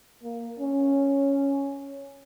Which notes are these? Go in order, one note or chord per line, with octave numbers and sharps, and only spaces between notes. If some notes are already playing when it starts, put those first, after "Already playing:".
A#3
C#4